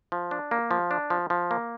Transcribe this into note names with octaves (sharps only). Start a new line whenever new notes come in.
F3
D4
A#3
F3
D4
F3
F3
A#3